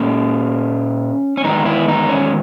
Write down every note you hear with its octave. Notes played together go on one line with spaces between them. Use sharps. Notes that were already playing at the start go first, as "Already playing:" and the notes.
Already playing: A#2 A#3 C#4
C#4
E2 D#3 G#3 B3 D#4
E4
D#4
C#4